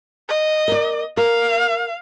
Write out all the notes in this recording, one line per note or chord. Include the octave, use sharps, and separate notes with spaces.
D#5
A#4 D5
A#4 F5